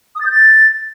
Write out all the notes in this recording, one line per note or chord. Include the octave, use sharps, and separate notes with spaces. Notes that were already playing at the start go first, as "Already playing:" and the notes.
D#6
A6
G6
A6